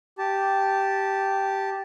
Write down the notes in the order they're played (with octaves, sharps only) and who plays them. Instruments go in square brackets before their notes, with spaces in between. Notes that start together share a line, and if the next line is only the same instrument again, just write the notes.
[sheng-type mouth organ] G4 A5